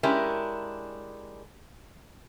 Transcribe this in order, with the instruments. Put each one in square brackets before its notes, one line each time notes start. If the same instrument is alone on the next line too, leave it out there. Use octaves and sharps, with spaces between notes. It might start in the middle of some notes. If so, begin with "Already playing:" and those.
[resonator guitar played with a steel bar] G#3 C#4 D4 E4 G4 A#4